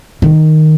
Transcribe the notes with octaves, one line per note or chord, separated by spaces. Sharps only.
D#3